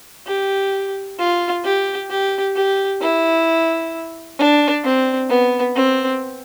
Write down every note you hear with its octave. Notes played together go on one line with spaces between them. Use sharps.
G4
F4
G4
G4
G4
E4
D4
C4
B3
C4